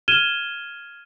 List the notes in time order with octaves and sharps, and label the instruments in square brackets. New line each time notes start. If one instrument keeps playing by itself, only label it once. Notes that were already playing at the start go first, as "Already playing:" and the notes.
[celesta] F6 G#6 D#7 E7 G7